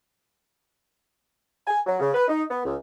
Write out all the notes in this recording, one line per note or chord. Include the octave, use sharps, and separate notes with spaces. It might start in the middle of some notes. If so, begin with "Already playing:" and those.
G#5
F#3
C#3
B4
D#4
B3
C#2